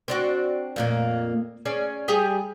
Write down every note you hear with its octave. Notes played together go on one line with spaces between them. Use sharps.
C4 D4 F#4
F2 A#2 A#3
C#4 G#4 D5
G3 G4 G#4